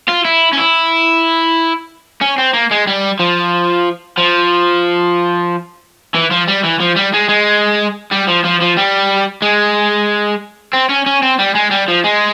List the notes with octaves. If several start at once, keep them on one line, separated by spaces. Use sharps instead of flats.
F4
E4
C#4
E4
C#4
C4
A#3
G#3
G3
F3
F3
E3
F3
G3
E3
F3
G3
G#3
G#3
G3
F3
F3
F3
G3
G#3
C4
C#4
C#4
C4
G3
G#3
G3
F3
G#3